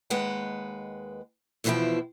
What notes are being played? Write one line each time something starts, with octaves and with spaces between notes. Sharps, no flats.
D#2 G#3 B4 F#5 G5
E2 B2 E3 F3 E4 G5